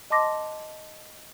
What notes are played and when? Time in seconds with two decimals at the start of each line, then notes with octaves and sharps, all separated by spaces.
0.10 D#5 A5 C6 D6 A#6